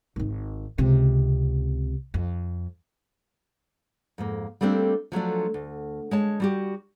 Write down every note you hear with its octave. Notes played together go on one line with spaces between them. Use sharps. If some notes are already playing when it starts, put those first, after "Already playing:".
G#1 D#3
C#2 C3
F2
F2 G#2 A#3
G3 A3 A#3 C4 D4
F3 F#3 A3 D4
D2
G#3 C#5 A5
G3 F#4 G4